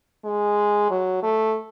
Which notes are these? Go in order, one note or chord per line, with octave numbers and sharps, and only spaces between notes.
G#3
F#3
A3